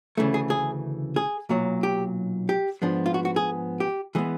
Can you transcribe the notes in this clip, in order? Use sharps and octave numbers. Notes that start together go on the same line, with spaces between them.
D2 C#3 E3 A3
G#4
G#4
G#4
B1 A#2 F#3
G4
G4
G#2 F3 G#3 B3 D4
F4
F#4
F#4
G#4
G4
E3 G#3 B3